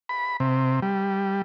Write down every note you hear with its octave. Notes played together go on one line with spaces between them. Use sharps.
B5
C3
G3